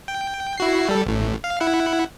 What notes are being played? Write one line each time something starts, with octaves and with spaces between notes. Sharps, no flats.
G5
E4 F#4 C7
G3 A4
A1 A2
F5
E4 F#5